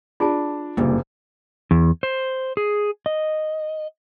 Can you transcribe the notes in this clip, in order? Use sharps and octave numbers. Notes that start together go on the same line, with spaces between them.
D4 F4 G#4 A5
F#1 C2 G2 A#2
E2
C5
G#4
D#5